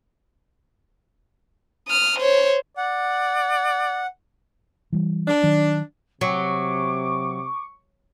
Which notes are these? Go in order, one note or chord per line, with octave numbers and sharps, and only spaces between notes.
D#6 F6
C5 C#5
D5 F#5
E3 G3
D4
D#3 F#3
C3 F#3 C#6 D6